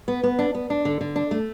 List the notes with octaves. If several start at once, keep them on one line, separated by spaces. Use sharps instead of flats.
B3
B3
D4
B3
D4
D3
D3
D4
A3